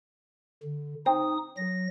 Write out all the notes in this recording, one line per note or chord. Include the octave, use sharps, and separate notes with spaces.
D3
C4 D#4 D#6
F#3 A#6